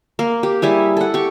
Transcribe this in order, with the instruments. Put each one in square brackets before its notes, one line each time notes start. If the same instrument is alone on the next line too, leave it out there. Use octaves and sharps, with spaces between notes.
[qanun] A#3
G4
G3 E4 G#4
A4 F#5
G4 C#6